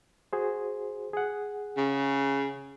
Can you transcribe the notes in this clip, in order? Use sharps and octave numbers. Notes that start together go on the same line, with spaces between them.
F#4 G#4 C5
G#4 F#5
C#3